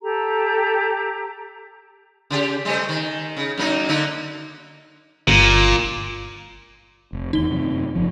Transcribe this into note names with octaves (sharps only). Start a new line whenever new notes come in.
G4 A4 A#5
C#3 G4
G3 A3 C5
D#3
C#3
F#2 A#3 D#4
D3 A#3 D#4
G1 A#2
F1
E2 D#3 D#4 G7
F#2 C3
F#1 F3